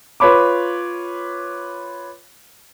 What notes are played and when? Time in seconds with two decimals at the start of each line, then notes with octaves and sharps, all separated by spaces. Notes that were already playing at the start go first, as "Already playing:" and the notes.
0.20 F4 B4 C#5 B5 D6